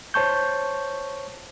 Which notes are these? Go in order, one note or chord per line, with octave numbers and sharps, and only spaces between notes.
C5 C#5 A5 C#6 G6